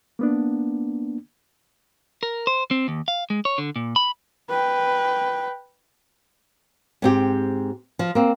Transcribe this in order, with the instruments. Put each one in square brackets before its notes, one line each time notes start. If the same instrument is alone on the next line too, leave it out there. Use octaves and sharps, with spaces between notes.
[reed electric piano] A#3 B3 D4
[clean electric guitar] A#4
C5
C4
D#2
F5
G#3
C#5
D3
A#2
B5
[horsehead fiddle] B4 G5
[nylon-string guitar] G#2 C4 G4
F3
A#3 C4